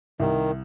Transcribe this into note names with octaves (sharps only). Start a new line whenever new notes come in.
C2 D#3